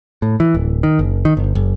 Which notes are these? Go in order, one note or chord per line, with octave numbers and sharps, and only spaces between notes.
A2
E3
D1
D#3
F#1
D#3
G1
F#1